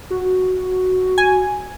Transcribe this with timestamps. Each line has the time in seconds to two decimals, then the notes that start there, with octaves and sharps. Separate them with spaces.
0.11 F#4
1.18 G#5